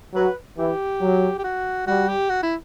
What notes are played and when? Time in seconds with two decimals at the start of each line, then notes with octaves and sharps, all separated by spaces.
0.15 F#3 B4
0.58 E3 G4
1.01 F#3
1.38 G4
1.44 F#4
1.87 G3 F#4
2.08 G4
2.30 F#4
2.43 E4